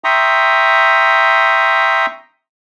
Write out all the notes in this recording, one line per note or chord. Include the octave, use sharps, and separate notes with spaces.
E5 G5 A#5 C6 C#6 D#6